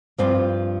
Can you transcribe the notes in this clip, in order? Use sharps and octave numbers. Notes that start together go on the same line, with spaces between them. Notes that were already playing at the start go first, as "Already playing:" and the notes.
G2 F3 C4 F4